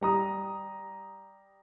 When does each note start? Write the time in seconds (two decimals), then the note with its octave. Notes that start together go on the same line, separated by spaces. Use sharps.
0.01 G3 A#5 D#6